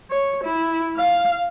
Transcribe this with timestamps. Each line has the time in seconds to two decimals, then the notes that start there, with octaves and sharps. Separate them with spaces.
0.11 C#5
0.45 E4
0.97 F5